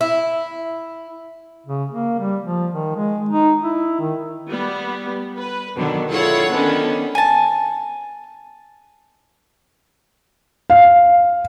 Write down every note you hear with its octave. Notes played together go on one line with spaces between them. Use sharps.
E4
C#3
A#3
G3
F3
D#3
G#3
D#4
E4
D#3
G3 B3
B4
B2 D3 D#3 F#3 B3
E4 F4 G#4 A4 C#5 F#5
D3 D#3 B3 C#4 D4
G#5 A5
F5